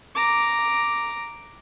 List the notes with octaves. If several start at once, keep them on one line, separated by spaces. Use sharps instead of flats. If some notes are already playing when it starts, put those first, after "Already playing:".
A#5 D6